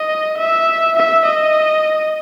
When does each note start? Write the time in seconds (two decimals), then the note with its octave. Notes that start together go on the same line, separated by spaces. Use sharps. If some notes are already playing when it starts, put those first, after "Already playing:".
Already playing: D#5
0.38 E5
0.96 E5
1.26 D#5